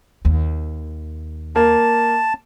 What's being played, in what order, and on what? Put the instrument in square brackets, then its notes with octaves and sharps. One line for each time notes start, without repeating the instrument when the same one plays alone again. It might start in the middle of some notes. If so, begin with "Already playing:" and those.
[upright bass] D#2
[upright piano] A#3 [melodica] A5